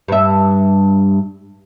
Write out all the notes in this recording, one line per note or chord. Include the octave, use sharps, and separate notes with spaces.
G2 E5